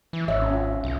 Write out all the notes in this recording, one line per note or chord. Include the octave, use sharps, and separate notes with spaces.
E3
G#1 C#5 D#5 E5
C#4
F4
B1